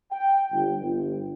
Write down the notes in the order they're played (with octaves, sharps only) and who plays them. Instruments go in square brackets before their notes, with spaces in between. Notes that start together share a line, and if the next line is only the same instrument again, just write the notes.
[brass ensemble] G5
G1
G1